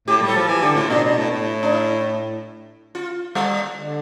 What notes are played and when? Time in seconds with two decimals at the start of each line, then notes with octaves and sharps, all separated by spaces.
0.08 A2 G4
0.22 G3
0.28 A4
0.35 F3
0.49 E3 G4
0.62 D3 G4
0.76 A2 F4
0.90 B2 D4
1.04 B2
1.17 A2
1.31 A2
1.63 D4
1.72 E4
2.95 F4
3.35 G3
3.77 D3